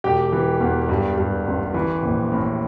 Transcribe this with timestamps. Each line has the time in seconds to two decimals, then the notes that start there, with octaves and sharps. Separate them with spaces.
0.04 E1 G4 G5
0.32 E3
0.60 E2
0.89 G2
1.18 G2
1.46 A1
1.74 E3
2.03 A#1
2.32 A2